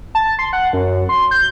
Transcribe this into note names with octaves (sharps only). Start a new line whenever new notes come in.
A5
C6
F#5
F#2
C6
G6